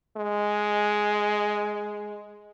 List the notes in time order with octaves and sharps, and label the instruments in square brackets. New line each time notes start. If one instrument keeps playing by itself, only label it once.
[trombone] G#3